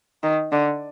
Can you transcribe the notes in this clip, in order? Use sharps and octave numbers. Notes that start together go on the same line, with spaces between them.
D#3
D3